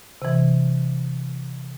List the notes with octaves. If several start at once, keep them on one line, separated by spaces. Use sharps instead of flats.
C3 E3